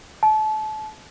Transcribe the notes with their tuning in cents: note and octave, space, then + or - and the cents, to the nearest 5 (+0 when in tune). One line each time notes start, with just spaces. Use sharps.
A5 -30